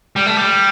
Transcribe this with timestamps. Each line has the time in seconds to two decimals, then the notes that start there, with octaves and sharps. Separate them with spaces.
0.16 G3
0.26 A3
0.37 G3